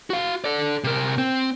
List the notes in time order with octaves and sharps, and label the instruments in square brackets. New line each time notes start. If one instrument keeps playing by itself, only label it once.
[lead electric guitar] F#4 F5
A4 D5
C3 A#4
C4